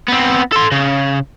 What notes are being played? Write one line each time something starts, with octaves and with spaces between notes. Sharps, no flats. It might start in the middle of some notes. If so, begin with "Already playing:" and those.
B3 C4
A4 C6
C#3